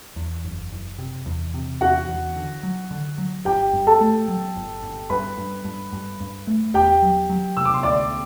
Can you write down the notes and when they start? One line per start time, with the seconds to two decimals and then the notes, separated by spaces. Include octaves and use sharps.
0.16 E2
0.44 F#1
0.72 F#1
0.98 C3
1.26 E2
1.54 C3
1.81 E2 F#4 F#5
2.09 E2
2.36 D3
2.63 F#3
2.91 D3
3.18 F#3
3.45 G1 G4 G5
3.73 G2
3.87 A4 A5
4.01 A3
4.28 F#3
4.56 G1
4.82 G1
5.10 G2 B4 B5
5.38 G2
5.64 G2
5.93 G2
6.20 G2
6.47 A3
6.74 E1 G4 G5
7.02 F#3
7.29 F#3
7.57 C3 E6
7.65 D6
7.74 C6
7.83 D2 D5 D6